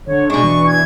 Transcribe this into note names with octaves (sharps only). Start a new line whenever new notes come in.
D3 C#5
B2 G#3 D4 C#6
E3
G#6